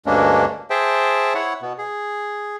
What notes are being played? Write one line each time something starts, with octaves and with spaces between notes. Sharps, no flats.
D2 G2 G#3 A#3 C#4 D4
G#4 C5 E5 G5 A5
E4 C#5 F#5
B2 B3
G#4